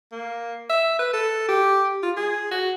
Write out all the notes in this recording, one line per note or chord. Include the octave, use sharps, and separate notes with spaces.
A#3
E5
B4
A4
G4
F4
G#4
F#4